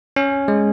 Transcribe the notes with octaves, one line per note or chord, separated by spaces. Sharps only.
C#4
G#3